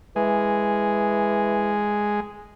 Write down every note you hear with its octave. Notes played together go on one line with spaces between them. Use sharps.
E3 G#3